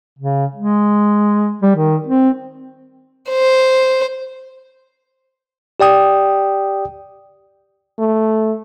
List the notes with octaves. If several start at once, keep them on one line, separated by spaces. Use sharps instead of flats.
C#3
G#3
G3
D#3
C4
C5
G4 D5 G5 D#6
A3